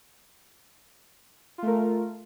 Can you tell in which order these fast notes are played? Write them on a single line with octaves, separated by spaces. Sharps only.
F4 A3 A#4